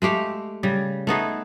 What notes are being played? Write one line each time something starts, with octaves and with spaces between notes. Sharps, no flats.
G#3 A3 G4 F5
C#3 G3
A3 B3 D#4 G#4